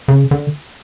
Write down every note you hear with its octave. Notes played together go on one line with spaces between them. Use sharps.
C#3
D3